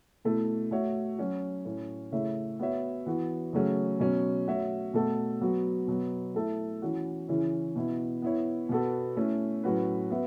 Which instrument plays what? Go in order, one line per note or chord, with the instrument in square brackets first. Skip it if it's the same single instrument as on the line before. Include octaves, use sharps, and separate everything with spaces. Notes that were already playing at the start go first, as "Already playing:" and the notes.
[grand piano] B2 A3 E4 A4 E5
A3 F#4 C#5 E5
F#3 C#4 F#4
A2 A3 C#4
C#3 A3 E4 C#5 E5
B3 F#4 C#5 E5
E3 B3 F#4
C#3 F#3 A3 C#4 F#4
B2 F#3 C#4
A3 F#4 C#5 E5
B2 A3 F#4 A4
F#3 B3 F#4
B2 F#3 B3
A3 E4 A4 E5
E3 C#4 F#4
C#3 E3 C#4 E4
B2 B3 E4
B3 E4 C#5
B2 B3 F#4 A4
A3 C#4 E4
A2 F#3 C#4 F#4 B4
B3 F#4 B4 E5